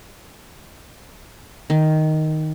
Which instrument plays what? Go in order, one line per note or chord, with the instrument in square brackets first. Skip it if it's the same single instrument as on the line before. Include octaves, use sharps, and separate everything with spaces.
[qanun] D#3